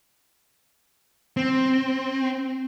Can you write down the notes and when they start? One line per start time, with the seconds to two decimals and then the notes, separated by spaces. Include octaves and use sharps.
1.37 C4